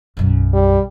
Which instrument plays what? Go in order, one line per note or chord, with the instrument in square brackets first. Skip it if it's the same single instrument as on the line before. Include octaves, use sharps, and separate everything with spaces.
[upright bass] B1 F#2
[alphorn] G3